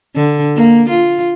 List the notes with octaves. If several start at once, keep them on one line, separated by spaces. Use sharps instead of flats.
D3
A#3
F4